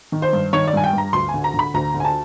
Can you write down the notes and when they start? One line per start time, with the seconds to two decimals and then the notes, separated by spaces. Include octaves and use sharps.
0.12 D#3
0.22 C5
0.33 G2
0.53 D#3 C#5
0.67 D5
0.73 G2 G#5
0.84 G5
0.93 G2 A#5
1.13 D2 C6
1.29 G#5
1.34 D3
1.44 A#5
1.54 D3 B5
1.74 D2 A#5
1.94 D3
2.00 G#5
2.04 A5